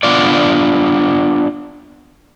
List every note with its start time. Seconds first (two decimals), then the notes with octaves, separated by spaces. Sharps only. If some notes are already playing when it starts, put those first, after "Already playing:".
0.03 B3 D4 F4 D5